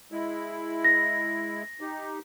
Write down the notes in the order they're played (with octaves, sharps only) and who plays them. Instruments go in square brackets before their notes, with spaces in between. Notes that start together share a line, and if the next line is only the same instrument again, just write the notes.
[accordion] G#3 E4
[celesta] A#6
[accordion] D#4 G4